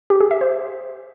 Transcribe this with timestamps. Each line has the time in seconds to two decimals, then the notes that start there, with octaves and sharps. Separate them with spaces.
0.10 G4
0.20 G#4
0.31 E5
0.41 C5